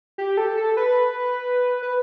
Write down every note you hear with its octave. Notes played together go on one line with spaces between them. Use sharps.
G4
A4
A4
B4
B4